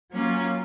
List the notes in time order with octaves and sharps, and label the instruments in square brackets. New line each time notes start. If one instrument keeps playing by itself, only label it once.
[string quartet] F#3 A#3 C#4 F4